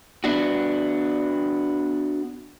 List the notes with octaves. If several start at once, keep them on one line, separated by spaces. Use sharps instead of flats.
B3 D4 F#4